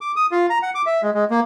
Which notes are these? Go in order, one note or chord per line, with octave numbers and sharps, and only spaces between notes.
D6
D#6
F4
A#5
F#5
D6
E5
G#3
G#3
A#3